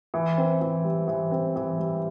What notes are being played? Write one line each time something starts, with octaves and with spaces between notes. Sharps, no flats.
E3
C4
E3
G3
E3
C4
E3
G3